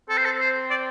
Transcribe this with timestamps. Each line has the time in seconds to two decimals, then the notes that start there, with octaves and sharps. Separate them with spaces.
0.09 C4 A4
0.18 C5
0.25 A4
0.40 C5
0.70 D5